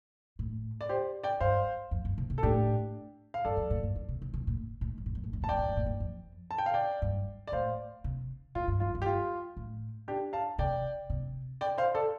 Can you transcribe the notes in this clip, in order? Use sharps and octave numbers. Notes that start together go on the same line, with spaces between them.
A2
D5
G4 C5
D5 G5
G2 C5 F5
F2
G2
C3
C3
A4
A2 D4 G4
F5
G2 A4 D5
F2
A2
G2
G2
C3
C3
C3
A2
A2
G2
A2
G2
A2
G2
A2 A5
G2 D5 G5
A2
G2
A2
G2
F2
A5
G5
F5
D5 G5
G2
D5
A2 C5 F5
C3
A2 F4
G2
F2 F4
G2
G4
F4
A2
D4 G4
F5 A5
C3 D5 G5
C3
D5 G5
C5 F5
A4 D5